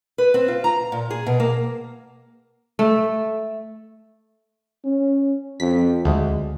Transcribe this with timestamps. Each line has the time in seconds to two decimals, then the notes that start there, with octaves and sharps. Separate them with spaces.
0.18 B4
0.34 C4
0.48 F4
0.64 A#5
0.92 A#2
1.10 G#4
1.26 B2
1.40 A#3
2.79 A3
4.85 C#4
5.60 F2 B6
6.05 D2 G#3